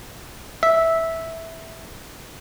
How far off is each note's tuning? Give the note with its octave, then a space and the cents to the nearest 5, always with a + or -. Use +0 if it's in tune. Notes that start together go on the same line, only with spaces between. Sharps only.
E5 -10